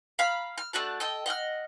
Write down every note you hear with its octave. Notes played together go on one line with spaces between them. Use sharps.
F5 A#5 B5 F6
F6
A3 D4 F#4 A5
A4 D#5 G5
D#5 F#5 E6 F6